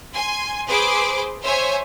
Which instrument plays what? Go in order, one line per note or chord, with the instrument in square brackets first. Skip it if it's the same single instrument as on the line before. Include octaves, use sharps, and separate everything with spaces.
[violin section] G#5 C6
G#4 B4 C5 C6 D6
C5 C#5 E5 G#5